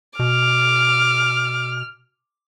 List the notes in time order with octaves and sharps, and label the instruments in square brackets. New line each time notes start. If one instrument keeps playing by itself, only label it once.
[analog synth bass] B2 [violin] D6 [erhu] F6